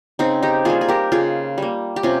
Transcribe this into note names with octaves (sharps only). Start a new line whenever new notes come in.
C#3 C4 D#4
D#4 G4
G3 A#3 F4 G#4
G#4
G4 A#4
C#3 F4 G#4
G3 A#3
G4
C3 C#4 F4